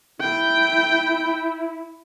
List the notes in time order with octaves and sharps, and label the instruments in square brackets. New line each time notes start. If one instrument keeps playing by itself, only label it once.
[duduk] E4 [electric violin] G5